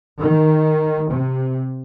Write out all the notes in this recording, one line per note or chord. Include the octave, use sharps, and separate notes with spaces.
D#3
C3